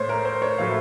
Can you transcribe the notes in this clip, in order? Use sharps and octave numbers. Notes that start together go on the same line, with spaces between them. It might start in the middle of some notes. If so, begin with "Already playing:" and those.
Already playing: A2 A3 C5 C#5
A#4
C5
C#5
A2 F#3 A3 F5